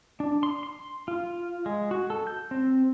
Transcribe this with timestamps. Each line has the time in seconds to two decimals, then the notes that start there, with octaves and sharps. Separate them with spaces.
0.20 D4
0.43 C6
0.63 C6
1.08 F4
1.66 G#3
1.91 F#4
2.10 A4
2.27 G6
2.51 C4